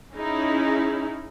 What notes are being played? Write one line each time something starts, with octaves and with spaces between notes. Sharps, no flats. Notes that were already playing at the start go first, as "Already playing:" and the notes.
C#4 D#4 E4 G#4